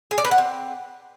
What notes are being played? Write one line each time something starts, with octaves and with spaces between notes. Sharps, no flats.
G#4
D5
B4
F#5
C4